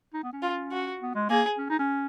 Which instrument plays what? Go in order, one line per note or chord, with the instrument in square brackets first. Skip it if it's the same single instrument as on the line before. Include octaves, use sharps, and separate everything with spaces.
[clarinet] D#4
B3
C#4
[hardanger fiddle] F4
F#4
[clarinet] B3
G#3
[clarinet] A#3 [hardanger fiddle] G#4
[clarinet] C#4
D#4
C#4